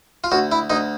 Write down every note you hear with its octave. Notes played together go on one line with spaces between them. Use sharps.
F4
D2 F#4
E4
D2 D#4